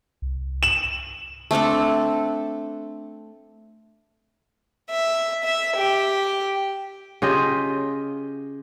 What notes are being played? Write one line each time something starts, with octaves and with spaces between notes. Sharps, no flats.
C2
E7 F#7
A3 C4 D4 A4
E5
E5
G4
C#3 F4 G4 D#5